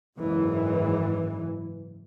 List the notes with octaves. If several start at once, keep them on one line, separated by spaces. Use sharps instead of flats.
F#1 G#2 E3